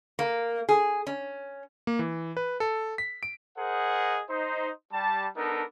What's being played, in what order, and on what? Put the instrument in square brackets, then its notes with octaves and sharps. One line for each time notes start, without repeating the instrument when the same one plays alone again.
[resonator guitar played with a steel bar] A#3
G#4
C#4
[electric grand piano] A#3
E3
B4
A4
B6
D7
[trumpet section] G#4 A#4 C5 D#5 F#5
D#4 C5
G3 A5
B3 D4 D#4 A4 A#4